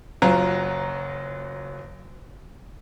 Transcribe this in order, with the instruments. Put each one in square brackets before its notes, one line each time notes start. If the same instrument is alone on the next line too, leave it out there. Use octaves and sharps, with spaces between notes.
[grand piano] F#1 F#3 F4 A#5